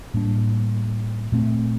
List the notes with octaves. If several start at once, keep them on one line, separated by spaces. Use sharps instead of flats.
A2 G3 A#3 D4
A#2 A3 C4